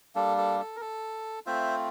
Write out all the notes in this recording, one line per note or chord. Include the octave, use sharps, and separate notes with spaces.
G3 A#3 D4 A4
A4
A4
A#4
A4
A3 C4 F4 C5 E5